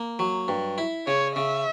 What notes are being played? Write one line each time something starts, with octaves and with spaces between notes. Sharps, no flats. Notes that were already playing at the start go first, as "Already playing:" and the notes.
Already playing: A#3
F#3
G2
E4
C#3 C#5
C#3 E5